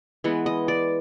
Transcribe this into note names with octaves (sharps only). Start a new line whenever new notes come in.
E3 G#3 B3
D#5
D5